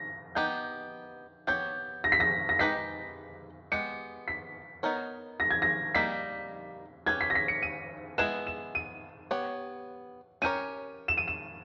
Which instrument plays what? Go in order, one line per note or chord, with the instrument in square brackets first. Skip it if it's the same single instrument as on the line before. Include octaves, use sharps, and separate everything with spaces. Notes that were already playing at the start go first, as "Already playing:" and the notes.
Already playing: [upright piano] A#6
[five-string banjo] B3 D#4 G4 [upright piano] G6
[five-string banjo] B3 G4 C#5 [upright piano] G6
[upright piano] A#6
B6
A#6
A#6
[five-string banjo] G#3 D#4 G4 B4 D#5 [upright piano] B6
[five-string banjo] G#3 B3 G4 [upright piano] C#7
[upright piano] B6
[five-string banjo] B3 D#4 A#4 C#5
[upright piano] A#6
G#6
A#6
[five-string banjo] G3 A#3 D#4 [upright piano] B6
[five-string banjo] C#4 G4 B4 [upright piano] G#6
[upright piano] B6
A#6
B6
C#7
D#7
[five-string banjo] G#3 B3 E4 G#4 B4 [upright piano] E7
[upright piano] E7
D#7
[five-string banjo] B3 G4 C#5
[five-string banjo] C#4 G4 A#4 C#5 [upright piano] D#7
[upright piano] E7
D#7
E7